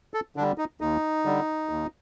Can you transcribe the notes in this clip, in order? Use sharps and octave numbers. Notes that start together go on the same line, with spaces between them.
A4
D3 G3 D4
D#4
D#2 D#4
D3 G3
D#2